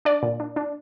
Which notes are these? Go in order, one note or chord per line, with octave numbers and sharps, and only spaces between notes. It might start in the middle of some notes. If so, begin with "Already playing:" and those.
D4 D5
A#2
D4
D4